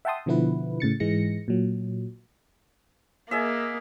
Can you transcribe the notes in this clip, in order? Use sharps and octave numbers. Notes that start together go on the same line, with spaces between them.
E5 F#5 G5 A5 C6 D#6
B2 D3 F3 B3 E4 B4
A2 C#3 A6 C#7
G#2 E3 G#3 A#6 C#7
A#2 F#3
A#3 G#4 D#5 E5